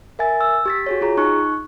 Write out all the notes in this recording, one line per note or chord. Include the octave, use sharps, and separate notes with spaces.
A#4 E5 G#5 A6
E6
G4 A6 B6
F#4 G#4 C#5
F4 G#4 A#5
D#4 C#6 F#6